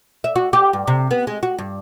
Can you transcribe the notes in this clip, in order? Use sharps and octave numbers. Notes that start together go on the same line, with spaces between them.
E5
F#4
G4
G2
C3
B3
G#3
F#4
G2